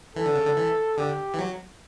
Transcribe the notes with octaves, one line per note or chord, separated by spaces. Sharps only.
E3 A4
D3
C#3
D3
E3
D3 G4
E3
F#3